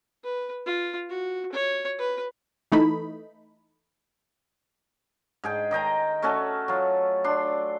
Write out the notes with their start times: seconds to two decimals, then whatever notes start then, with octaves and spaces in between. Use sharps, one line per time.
0.24 B4
0.66 F4
1.10 F#4
1.53 C#5
1.99 B4
2.72 E3 A3 D#4 B5
5.44 G#2 G#4 G5
5.71 D#3 D#5 G5 A#5
6.22 A3 C#4 F#4 A4
6.68 F#3 F4
7.24 D4 C6